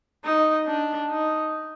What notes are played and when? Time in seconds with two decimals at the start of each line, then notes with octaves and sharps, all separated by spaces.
0.25 D#4
0.67 D4
1.10 D#4